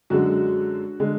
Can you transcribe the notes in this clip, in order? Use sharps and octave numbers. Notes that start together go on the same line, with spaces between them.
F#2 D3 G#3 F#4
D3 G#3